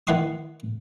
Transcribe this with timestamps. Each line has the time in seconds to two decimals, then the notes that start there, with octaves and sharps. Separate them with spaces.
0.07 D#3 E3 F#5 C6 D#6